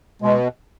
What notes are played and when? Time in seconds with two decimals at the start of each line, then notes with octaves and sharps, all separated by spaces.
0.22 B2 G#3